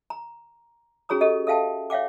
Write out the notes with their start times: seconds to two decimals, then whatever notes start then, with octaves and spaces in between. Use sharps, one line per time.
0.10 A#5
1.09 C#4 F#4 G#4 C#5 A#5 D#6
1.21 G4 A4 D#5
1.47 A4 E5 F5 G5 A5
1.90 C#5 E5 F5 G5 D6